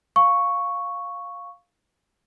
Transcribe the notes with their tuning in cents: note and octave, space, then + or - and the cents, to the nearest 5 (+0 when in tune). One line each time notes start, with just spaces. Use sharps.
F5 +5 C#6 +0